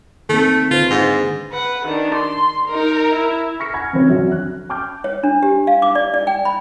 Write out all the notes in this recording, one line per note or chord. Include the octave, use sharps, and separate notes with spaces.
D#3 A3 A#3 C4
D3 F4 B4 C5
G#2
B4 F#5
D#3 D4
C6
D#4 A#4
E4
C#6 F6 A#6 B6 C#7
F#5 G#5 B5 F6 G#6
C3 D#3 E3 F#3 C4 C#4
F2 D3 F#3 F#4 E5
F#6
G5 A5 D6 F6 G6
C#5
D4
G4
F5
D6
D5
D5
G5
B5